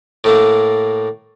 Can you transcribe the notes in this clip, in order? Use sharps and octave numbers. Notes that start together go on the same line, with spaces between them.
A2 A3 A#3